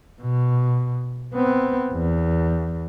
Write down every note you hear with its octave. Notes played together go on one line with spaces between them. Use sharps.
B2
B3 C4
E2